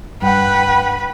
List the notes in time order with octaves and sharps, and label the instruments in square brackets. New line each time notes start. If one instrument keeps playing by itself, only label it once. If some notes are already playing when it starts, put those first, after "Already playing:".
[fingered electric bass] G2 [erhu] B4 [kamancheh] F#5 G5